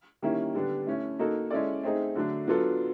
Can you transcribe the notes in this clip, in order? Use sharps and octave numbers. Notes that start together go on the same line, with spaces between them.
D#3 G3 A#3 C#4 E4
D3 G3 B3 D4
A3 C#4 E4
A#3 D#4 F#4 A4
G#3 C#4 E4 A4 D5
A3 C4 D#4 G#4
D3 F#3 A3 D4
F#3 B3 D4 F4 A4